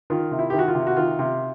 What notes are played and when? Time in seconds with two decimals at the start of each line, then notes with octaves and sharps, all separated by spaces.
0.10 D#3 F4
0.31 C3
0.39 E4
0.50 D#3 G4
0.59 F#4
0.68 F4
0.75 C3
0.87 F#4
0.97 D#3 F4
1.19 C3